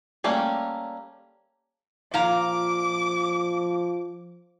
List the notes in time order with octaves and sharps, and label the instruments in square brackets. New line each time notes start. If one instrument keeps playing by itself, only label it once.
[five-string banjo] G3 A3 A#3 C#4
[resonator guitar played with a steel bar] A#2 F5 A#5 [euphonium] F3 [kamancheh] D6